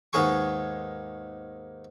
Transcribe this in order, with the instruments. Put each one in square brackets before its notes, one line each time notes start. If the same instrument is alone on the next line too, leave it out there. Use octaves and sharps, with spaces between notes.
[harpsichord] D#2 G#2 B3 G#4 G#5 C#6